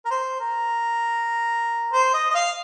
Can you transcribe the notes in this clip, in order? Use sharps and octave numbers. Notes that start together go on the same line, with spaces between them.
A#4
C5
A#4
C5
D#5
D#5
F5